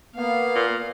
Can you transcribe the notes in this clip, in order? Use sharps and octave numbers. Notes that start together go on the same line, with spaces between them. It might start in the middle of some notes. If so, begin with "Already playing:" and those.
A#3 B3 F5
A#2